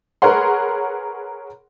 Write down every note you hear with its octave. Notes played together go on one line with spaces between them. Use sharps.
G#4 A#4 B4 C#5 F#5 C6